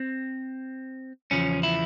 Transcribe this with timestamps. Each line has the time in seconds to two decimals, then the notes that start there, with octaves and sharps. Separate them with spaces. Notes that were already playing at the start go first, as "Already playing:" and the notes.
Already playing: C4
1.31 E2 C#3 F3 C#4
1.63 E4